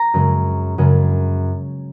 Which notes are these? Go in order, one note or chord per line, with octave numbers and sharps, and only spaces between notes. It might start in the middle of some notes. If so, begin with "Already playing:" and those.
Already playing: A#5
F#2 C#3 G#3
F#2 C#3 G#3